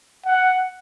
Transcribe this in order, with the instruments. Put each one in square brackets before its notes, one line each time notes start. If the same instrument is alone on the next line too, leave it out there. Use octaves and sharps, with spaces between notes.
[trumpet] F#5